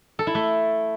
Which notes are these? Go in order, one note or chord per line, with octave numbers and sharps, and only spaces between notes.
A4
E4
A3